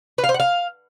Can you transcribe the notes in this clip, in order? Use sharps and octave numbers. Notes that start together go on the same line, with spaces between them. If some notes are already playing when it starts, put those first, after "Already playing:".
B4
F5
C5
F#5
F5